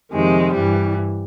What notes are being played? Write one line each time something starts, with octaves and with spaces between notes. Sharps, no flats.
F2 C3 D#3 G#3
G2 E3 G3